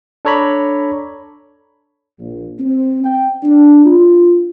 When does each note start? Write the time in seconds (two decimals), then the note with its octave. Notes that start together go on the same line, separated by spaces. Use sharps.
0.25 D4 A4 C#5 A#5 B5 D6
2.19 A#1
2.60 C4
3.04 G5
3.43 D4
3.85 F4